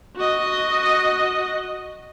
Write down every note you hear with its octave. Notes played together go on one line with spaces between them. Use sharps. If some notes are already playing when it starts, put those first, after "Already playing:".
F#4 D#5